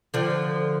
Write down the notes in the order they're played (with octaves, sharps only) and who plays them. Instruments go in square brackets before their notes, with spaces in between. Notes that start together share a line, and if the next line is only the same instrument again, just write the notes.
[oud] D3 F3